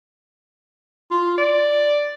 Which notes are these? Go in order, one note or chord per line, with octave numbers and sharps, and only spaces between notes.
F4
D5